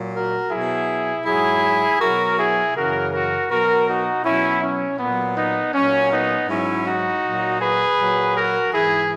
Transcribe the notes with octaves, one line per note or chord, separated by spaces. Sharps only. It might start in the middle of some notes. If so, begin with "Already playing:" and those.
Already playing: A#2 F#3
F#4 A#4
B2 F#3 E4 G#4
G#2 F#3 E4 G#4
B2 F#3 F#4 A#4
E4 G#4
F#2 C#3 E3 F#4 A#4
F#4 A#4
B2 F#3 F#4 A#4
D#4 F#4
B2 F#3 C#4 E4
C#4
A#2 F#3 B3
B3 D#4
A#2 F#3 C#4
B3 D#4
G#2 F#3 C#4 E4
D#4 F#4
A#2 F#3
G#4 B4
A#2 F#3
F#4 A#4
G#2 E3 E4 G#4